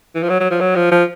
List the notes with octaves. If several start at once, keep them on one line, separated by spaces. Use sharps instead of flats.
E3
F3
F#3
F#3
F3
F#3
F3
F3